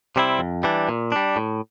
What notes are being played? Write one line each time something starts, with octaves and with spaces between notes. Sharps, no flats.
C3 G3 C4 E4
F2
E3 G3 D4
A#2
G3 D4
A2